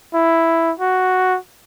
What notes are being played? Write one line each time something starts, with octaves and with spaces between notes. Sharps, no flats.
E4
F#4